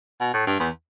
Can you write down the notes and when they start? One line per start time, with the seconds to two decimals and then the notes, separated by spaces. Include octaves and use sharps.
0.20 B2
0.34 A2
0.47 G2
0.60 E2